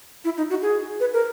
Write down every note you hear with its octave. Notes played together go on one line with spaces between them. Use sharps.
E4
D#4
F#4
G#4
B4
A#4